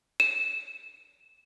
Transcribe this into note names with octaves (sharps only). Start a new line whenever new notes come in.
E7